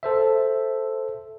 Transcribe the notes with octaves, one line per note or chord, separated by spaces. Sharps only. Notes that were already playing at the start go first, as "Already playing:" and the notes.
A4 C5 E5